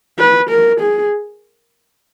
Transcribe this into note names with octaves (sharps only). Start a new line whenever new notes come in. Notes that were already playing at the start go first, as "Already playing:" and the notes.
B4
A#4
G#4